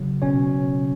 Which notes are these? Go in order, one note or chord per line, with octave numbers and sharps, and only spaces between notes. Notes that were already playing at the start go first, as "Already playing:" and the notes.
Already playing: C#3 F#3
B2 C#4 C#5